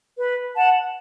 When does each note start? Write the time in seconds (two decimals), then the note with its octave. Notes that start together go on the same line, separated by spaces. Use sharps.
0.19 B4
0.55 F#5 A5